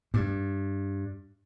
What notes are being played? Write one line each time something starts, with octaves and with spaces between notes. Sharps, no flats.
G2